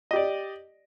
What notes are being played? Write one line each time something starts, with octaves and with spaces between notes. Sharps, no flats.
G4 D5 D#5